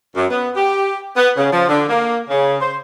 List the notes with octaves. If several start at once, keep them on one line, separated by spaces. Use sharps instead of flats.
F#2
B3
G4
B3
C#3
F3
D3
A#3
C#3
C5